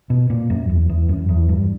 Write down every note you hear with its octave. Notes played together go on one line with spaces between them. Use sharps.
B2
A#2
F#2
E2
E2
F#2
E2
G2